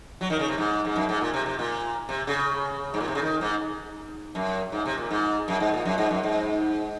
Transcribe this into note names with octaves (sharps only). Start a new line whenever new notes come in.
F#3
D#3
C#3
C3
G#2
G#2
F#2
G#2
A#2
C3
C3
A#2
C3
C#3
G#2
A#2
C3
C#3
D#3
G#2
F#2
G#2
C3
A#2
G#2
F#2
G#2
A#2
F#2
G#2
F#2
G#2